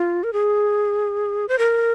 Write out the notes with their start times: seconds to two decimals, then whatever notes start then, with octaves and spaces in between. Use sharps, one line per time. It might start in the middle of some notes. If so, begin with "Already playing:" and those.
Already playing: F4
0.24 A#4
0.33 G#4
1.49 C5
1.59 A#4